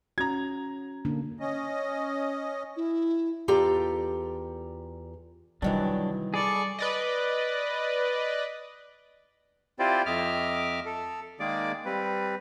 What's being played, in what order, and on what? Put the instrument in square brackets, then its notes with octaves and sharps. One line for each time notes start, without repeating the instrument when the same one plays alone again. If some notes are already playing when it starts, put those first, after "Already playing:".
[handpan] C#4 F#4 [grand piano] A#5 G#6
[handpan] D3 A#3 D4
[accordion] C#4 D#5
[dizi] E4
[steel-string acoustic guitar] E2 F4 G4 A4 D5 A#5
[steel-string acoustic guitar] C3 D#3 E3 [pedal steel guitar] F#3 D4 [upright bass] G3
[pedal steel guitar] G#4 A4 [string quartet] D5 B5 C#6
[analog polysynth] B4 D5 D#5
[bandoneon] C4 E4 F4 G4 C5 D5
F2 D#5 E5 D6 F6
A4
D#3 G#3 A#3 G#4 D5 D6
G3 C4 B4